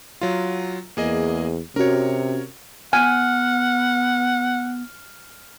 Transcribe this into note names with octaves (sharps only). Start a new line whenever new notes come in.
F#3 F4
E2 A#3 G#4 D#5
C3 C#4 F#4 A#4 C#5
B3 F#5 G#5 F6